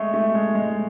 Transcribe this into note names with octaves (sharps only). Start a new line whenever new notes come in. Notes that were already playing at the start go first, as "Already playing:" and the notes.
Already playing: G#3 A3
A3
G#3
G#3